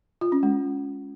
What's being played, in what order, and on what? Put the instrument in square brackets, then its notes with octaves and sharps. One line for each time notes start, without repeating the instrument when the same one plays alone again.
[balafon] F4
C#4
G#3